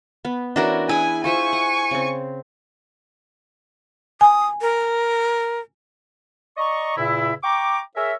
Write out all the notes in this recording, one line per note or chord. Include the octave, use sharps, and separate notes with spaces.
B3
E3 C#4 D4 F#4 A#4
E4 G#4 B4 G#5
F4 C5 E5 G#5 C#6
F#5
C#3 C4
G#5 D#6
A#4
D5 D#5 A#5 C#6
E2 A#2 C#3 E4
G5 A#5 C#6 D6
G#4 A#4 C#5 E5